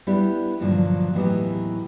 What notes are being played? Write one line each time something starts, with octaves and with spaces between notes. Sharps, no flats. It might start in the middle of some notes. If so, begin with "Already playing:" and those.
G3 B3 D4 E4 G4
G2 A#2 D3 F3 F#3
D#2 A2 E3 F#3 B3 G4